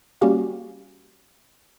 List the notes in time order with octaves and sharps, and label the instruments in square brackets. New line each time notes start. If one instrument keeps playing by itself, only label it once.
[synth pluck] G3 A#3 C#4 F#4 G4 F5